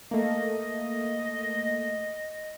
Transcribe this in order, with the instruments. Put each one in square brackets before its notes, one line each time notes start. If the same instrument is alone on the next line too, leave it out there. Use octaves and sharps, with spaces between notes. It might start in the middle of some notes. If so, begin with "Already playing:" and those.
[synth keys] A3 A#3 [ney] D#5